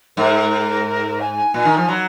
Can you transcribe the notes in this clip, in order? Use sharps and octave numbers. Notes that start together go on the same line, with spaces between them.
G#2 A#4
G#5
A#2
D#3
F3
F#3 B5